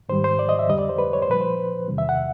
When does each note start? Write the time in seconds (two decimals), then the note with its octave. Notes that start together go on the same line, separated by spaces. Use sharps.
0.09 G#2 D#3 G3 C5
0.24 C5
0.39 D5
0.49 D#5
0.59 E5
0.69 F2 D3 G3 D#5
0.79 D5
0.89 C5
0.98 B4
1.13 C#5
1.22 C5
1.28 A#2 F3 B4
1.41 C5
1.88 E2 C3 D#3 G3
1.98 E5
2.09 F#5